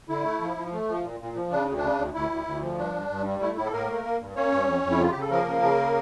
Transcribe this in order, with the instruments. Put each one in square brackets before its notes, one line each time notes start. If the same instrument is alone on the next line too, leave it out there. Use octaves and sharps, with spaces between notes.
[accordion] D3 E4
A3
F3
F3
A3
F3
A#2
A#2
F3
C#3 D4
D2
D4
C#3
D2
D2 E4
D2
D2
F3
G2 D4
G2
G2
G3
A3 E4
A2 E4
A4
A2 A#3 A#4
A3
A#3
G2
A#3 C#4 C#5
G2
F2
F2
E4
C#3 F4
C#3 G4
A4
F3 A#3 A#4
C#3
C#3